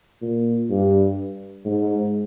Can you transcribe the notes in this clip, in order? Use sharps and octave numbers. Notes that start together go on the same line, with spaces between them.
A#2
G2
G#2